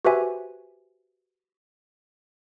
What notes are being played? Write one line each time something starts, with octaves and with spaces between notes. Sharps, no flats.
F#4 G4 B4 C5 E5 G#5